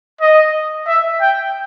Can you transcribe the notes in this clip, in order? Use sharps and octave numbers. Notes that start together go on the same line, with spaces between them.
D#5
E5
G5